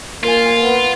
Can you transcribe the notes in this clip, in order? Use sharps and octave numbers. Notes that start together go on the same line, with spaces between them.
A#3 F4 A#4 G#5
B3